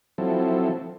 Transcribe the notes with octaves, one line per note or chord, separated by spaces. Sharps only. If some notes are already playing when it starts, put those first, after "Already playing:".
F3 F#3 C4 E4 A4